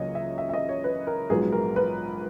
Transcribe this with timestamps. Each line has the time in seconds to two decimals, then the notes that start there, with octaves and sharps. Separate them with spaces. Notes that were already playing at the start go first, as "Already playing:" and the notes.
Already playing: C#2 C#3 F#3 A#3 C#5 D#5
0.15 E5
0.38 E5
0.49 E5
0.54 D#5
0.69 C#5
0.84 B4
1.07 A#4
1.30 A#1 G#2 F#3 B3 D#4 G#4
1.52 A#4
1.76 B4